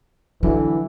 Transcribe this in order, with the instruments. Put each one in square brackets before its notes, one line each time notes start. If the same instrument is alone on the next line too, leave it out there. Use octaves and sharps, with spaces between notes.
[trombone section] D3 E3 [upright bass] F#3